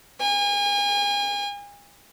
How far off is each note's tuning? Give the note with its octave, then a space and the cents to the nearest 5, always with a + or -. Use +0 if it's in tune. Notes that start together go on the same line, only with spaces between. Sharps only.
G#5 -35